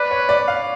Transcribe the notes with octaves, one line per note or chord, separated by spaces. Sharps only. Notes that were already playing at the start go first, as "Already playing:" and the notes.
Already playing: B4 D5
C#5
D5
F5